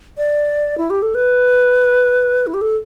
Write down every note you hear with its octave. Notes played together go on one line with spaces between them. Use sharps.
D5
E4
G4
A4
B4
E4
G4
A4